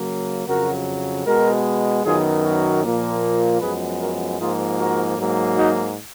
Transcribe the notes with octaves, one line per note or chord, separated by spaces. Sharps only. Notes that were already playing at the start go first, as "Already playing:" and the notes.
Already playing: C#3 F#3 A#3
F2 C#3 F#3 F#4 A#4
B2 G#3 B3 F#4 A#4
F#2 D#3 F#3 B3 F4 G#4
F#4 A#4
A#2 F3 A#3
F#2 F3 G#3 B3 G#4 B4
F#4 A#4
G#2 F3 A#3 F4 G#4
F#4 A#4
G#2 F#3 A#3
D#4 F#4